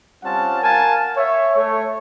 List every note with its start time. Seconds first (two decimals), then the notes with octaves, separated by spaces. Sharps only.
0.23 G3 C4 C#4 F4 F#5 A5
0.62 A#4 F5 F#5 G#5 A5
1.17 C#5 E5
1.56 A3 A4 C#5